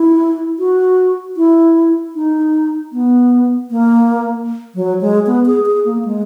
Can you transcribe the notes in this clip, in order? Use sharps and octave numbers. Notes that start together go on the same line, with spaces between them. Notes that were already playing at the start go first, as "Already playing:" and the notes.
Already playing: E4
F#4
E4
D#4
B3
A#3
F#3
G#3
B3
G#4
G#4
A#3
G#3